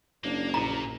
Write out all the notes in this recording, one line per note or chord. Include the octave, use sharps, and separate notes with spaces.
F#1 A#3 D4
A#1 A#2 E4 A#5